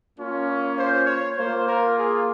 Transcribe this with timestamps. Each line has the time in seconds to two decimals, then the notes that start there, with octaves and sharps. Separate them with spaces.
0.17 A#3 C#4 F4
0.47 C#5
0.77 C5
1.07 C#5
1.37 A#3 F4 C5
1.66 A#4
1.97 G#4